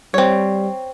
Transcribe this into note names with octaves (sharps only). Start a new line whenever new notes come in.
G3 C4 C#5